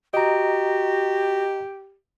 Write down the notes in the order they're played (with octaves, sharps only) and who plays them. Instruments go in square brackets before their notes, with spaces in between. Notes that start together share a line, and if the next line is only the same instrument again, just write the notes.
[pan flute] F#4 [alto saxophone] G4 [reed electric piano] D#5 A#5